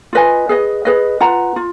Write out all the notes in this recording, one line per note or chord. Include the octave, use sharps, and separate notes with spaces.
F4 B4 D#5 G#5
G#4 B4 D#5
G#4 B4 D#5
F4 B4 F#5 A#5
F4